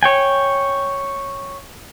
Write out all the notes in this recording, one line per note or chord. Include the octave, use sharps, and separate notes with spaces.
C#5 G5 G#5